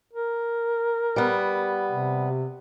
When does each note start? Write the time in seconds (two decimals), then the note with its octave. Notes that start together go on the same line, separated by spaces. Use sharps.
0.13 A#4
1.16 G3 B3
1.91 C3